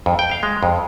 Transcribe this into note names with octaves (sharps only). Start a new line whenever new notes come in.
F2
G5
F5
G#3
F2